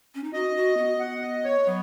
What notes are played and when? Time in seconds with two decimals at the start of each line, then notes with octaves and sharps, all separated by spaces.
0.15 C#4
0.24 D#4
0.33 F#4 D#5
0.56 F#4
0.77 B3
1.00 F#5
1.22 D#5
1.44 C#5
1.66 F#3 B3